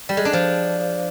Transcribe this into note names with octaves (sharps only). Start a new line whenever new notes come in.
G3
G#3
D4
F3